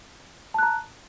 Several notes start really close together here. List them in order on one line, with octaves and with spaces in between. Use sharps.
A5 F#6 A#5